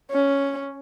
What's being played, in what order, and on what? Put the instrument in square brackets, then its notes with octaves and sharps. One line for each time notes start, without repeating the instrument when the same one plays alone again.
[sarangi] C#4